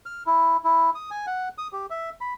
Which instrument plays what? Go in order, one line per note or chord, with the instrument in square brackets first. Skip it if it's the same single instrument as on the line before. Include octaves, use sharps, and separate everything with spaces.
[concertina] F6
E4
E4
D#6
G#5
F#5
D#6
G4
E5
B5